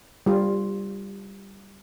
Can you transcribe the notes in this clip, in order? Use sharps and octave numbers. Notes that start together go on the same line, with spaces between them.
G3 F4